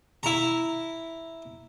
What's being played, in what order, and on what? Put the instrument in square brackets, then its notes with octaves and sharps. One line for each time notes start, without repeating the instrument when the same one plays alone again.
[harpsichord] E4 A#5